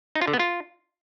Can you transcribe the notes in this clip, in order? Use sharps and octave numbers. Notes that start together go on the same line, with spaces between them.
D#4
F4
D3
B3
F4